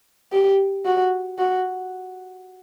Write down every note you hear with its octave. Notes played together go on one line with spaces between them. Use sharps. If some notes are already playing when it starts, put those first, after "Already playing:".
G4
F#4
F#4